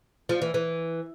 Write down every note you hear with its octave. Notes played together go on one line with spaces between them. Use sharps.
F3
E3
E3